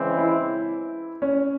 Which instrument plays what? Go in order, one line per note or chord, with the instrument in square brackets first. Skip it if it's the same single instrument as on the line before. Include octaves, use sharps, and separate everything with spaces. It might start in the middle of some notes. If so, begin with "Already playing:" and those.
Already playing: [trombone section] C#3 E3 G#3 C4
[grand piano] E4
C#4